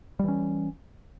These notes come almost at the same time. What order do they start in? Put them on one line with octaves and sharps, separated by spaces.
G3 E3 C#4